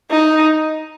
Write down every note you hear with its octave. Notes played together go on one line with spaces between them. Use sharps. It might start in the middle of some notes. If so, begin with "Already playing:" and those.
D#4